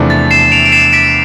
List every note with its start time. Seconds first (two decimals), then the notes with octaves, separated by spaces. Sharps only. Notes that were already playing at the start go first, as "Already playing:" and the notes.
Already playing: E2 C3 F3 A3 D4
0.10 A6
0.31 C7 E7
0.52 D7 F7
0.65 D7
0.72 C7 E7
0.93 B6 D7